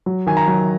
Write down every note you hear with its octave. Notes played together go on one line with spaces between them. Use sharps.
F#3
D#3 G#5
A#5
F#3